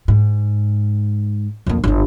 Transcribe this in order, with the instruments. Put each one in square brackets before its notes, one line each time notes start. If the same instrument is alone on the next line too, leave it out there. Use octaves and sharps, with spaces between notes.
[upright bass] G#2
F2 A#3
G1 E4